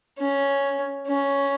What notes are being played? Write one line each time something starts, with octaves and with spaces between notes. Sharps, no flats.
C#4
C#4